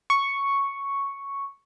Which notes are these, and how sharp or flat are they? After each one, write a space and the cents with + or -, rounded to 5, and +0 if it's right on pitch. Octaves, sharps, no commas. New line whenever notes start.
C#6 +0